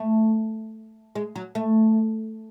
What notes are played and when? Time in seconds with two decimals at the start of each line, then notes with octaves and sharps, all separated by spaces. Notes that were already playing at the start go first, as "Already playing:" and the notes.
Already playing: A3
1.15 G#3
1.35 F#3
1.55 A3